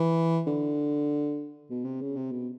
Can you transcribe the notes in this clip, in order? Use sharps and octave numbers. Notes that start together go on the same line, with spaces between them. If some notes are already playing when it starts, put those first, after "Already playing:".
Already playing: E3
D3
B2
C3
C#3
C3
B2